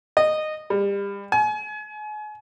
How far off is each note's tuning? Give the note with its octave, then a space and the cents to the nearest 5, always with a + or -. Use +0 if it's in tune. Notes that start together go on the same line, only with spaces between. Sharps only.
D#5 -15
G3 +30
G#5 +35